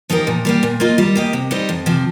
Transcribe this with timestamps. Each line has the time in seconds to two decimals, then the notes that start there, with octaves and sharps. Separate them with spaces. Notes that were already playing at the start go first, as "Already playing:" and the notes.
0.10 F3 D#4 G4 A#4
0.27 A#2
0.45 G3 A#3 G4
0.63 A#2
0.80 A#3 F4 D#5
0.98 G3
1.15 A#3 G4 D#5
1.33 C3
1.51 G3 D#4 C5 D#5
1.69 F2
1.86 C3 F3